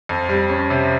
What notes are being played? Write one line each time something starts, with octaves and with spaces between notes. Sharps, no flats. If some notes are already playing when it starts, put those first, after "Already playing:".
F2
G3
C#4
C3